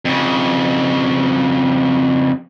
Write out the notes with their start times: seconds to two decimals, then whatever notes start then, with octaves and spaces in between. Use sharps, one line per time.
0.05 F2 C#3